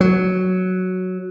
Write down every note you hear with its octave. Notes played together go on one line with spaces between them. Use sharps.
F#3